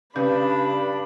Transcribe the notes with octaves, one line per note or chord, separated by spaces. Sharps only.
G2 C#3 D4 B4 B5